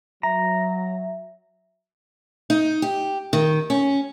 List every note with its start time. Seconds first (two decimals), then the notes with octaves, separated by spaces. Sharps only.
0.23 F#3 E5 A#5
2.50 D#4
2.82 G4
3.33 D#3
3.70 C#4